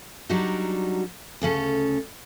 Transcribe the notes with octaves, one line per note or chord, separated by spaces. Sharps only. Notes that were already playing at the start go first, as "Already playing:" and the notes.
F#3 G3 D4 D#4 F#4
D2 C#3 C#4 A4